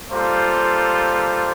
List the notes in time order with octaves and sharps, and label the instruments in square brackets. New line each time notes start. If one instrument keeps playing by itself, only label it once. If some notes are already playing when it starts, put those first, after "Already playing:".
[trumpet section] G3 A#3 F4 A4 C5